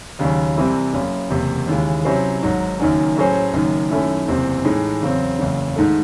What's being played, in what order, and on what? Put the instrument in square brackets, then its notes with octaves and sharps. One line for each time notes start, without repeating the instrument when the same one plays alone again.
[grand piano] D#2 C#3 F#3 C#4
C2 C3 E3 C4 E4
F#1 F#2 C#3
F#1 E2 C3
D#2 C#3 E3 G#3
C3 F#3 C#4 E4 C5
G#1 G#2 D#3 F#3
F#1 F#2 D#3 F#3 C#4
A2 F#3 C#4 G#4 C5
F#1 F#2 D#3
F#2 D#3 A3 C#4 E4
F#1 E2 C3 E3 C4
A2 E3 G#3 D#4
E2 C#3 F#3 C4
F#1 E2 C#3
G#2 D#3 A3